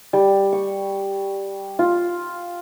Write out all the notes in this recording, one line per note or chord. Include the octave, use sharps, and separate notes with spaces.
G3
C#6
F4